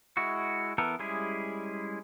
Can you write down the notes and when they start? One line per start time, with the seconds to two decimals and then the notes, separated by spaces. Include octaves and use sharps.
0.17 G#3 E4 F#4
0.78 E3 B3 A4 A#4
0.99 G3 G#3 C#4 E4 G#4